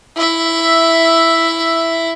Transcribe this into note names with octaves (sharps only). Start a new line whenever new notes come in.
E4 E5